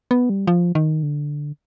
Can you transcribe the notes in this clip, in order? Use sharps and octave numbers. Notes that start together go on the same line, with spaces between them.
B3
G3
F3
D#3
D3